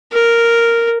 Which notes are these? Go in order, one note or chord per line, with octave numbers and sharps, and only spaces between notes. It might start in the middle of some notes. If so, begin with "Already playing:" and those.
A#4